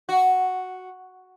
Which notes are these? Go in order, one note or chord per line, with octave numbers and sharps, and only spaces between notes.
F#4